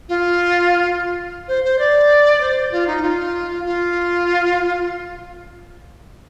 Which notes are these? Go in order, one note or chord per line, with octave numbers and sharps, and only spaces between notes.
F4
C5
C5
D5
C5
F4
D#4
F4
F4